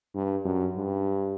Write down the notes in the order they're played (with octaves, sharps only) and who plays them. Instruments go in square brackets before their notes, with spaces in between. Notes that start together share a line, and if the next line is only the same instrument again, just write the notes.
[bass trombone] G2
F#2
G2